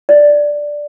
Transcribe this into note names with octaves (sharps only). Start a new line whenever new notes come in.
D5